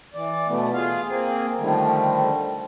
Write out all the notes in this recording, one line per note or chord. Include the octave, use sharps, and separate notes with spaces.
E3 D5
B2 A3 B3
F4 G#4 F5
A#3 C4 G#4
D3 D#3 F3 G3 A3